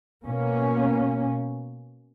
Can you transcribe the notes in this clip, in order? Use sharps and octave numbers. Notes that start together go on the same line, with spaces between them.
B2 A#3 C#4